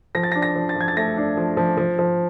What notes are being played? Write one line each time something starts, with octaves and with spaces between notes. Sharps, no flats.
F3 A#6
A6
A#6
D4
A#6
F3
A6
F3 G#6
A6
A3 A#6
D4
F3
F3
F3
F3